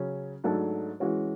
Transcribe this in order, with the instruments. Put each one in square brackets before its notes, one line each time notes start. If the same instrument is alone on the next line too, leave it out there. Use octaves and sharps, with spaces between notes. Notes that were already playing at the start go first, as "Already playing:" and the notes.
Already playing: [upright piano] C#3 F#3 C#4
G#2 F#3 A3 D4 A4
E3 G#3 C#4 F#4